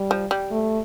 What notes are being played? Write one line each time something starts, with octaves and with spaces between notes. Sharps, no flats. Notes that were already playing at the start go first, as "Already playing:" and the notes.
Already playing: G3
F3
G3
A3